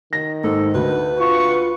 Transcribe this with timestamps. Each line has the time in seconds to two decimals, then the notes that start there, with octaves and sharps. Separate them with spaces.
0.13 D#3 A#6
0.44 G#2 A4
0.75 D2 B4
1.20 F4 C#6